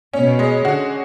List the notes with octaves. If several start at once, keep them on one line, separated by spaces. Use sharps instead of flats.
B2 C#4
G#3
D3 F#4